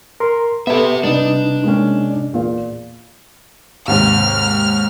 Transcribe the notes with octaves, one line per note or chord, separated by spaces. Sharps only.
A#4 C6
B3 G4 A4 E5
C3 G3 B3 D4 D#4 D#5
G#3 A#3 C#4
E2 A#2 F5
D#2 G#2 C3 F6